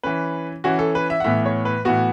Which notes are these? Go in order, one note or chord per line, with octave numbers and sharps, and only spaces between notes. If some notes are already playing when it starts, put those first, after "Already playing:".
E3 C#4 B4
E3 C#4 F#4
A4
B4
E5
F#5
A2 E3 B3 E5
C#5
B4
A2 E3 B3 F#4